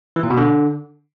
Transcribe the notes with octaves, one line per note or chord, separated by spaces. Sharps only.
E3
A#2
B2
D3